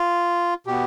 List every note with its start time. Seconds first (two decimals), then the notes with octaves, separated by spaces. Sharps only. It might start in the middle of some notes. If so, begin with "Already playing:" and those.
Already playing: F4
0.67 B2 B3 G4